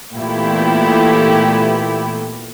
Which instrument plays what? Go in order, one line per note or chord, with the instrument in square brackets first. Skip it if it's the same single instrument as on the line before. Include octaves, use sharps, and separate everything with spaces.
[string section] A#2 E3 A3 B3 E4 G4